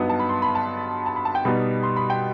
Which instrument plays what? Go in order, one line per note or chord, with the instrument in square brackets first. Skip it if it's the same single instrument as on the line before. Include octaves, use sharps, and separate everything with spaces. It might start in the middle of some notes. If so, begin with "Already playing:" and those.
Already playing: [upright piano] G2 F#3 B3 D#4
A5
B5
C6
B5
A5
A5
B5
A5
G5
B2 G3 B3 D#4 B5
C6
B5
G5